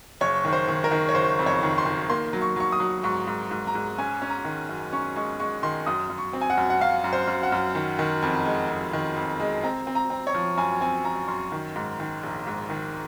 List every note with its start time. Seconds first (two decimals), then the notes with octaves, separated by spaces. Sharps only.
0.21 F#1 C#5
0.45 D#3
0.53 C5
0.68 D#3
0.84 A#4
0.91 D#3
1.09 C#5
1.15 F#1 C5
1.39 F2
1.46 C#5
1.63 D#3
1.78 C6
1.86 D#3
2.10 A#3 C6
2.33 F#3
2.42 C#6
2.56 F#3 C#6
2.72 D#6
2.80 F#3
3.03 G#2 C#6
3.27 G#2
3.51 G#2
3.67 A#5
3.75 G#2
3.98 C#4 G#5
4.22 C#4
4.29 A#5
4.45 D#3
4.69 F#2
4.92 C#4 C#6
5.16 G#3 C#6
5.39 G#3 C#6
5.63 D#3 C6
5.86 F#2 D#6
6.10 F#2
6.18 C#6
6.33 C4
6.41 G#5
6.50 F#5
6.57 F#2
6.70 F#5
6.80 F#2 F5
7.04 F#2
7.13 C5
7.27 F#2
7.43 F#5
7.52 F#2
7.75 D#3
7.99 D#3
8.22 F2
8.45 G#3
8.70 F2
8.93 D#3
9.16 F2
9.40 G#3
9.64 C4 A#5
9.87 C4
9.95 A#5
10.10 C4
10.27 C#5
10.35 F3
10.57 F#2 G#5
10.81 C4 G#5
11.05 F#2 A#5
11.28 F#2 C6
11.52 D#3
11.76 G#2
12.00 D#3
12.23 A#1
12.47 G#2
12.70 D#3